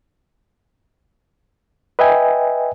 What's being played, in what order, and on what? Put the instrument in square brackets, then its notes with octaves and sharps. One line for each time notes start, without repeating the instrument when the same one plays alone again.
[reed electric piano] B4 D#5 E5 G5 G#5